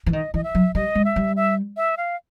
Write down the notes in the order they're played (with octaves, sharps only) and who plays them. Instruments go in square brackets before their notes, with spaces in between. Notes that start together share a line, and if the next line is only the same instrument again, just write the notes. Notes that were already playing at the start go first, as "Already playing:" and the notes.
[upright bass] E3
[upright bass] D#3 [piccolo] D#5
[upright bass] E3 [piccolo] D#5
[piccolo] E5
[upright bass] F#3
[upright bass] G3 [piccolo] D#5
[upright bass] G#3
[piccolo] E5
[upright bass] G3
[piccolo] E5
E5
F5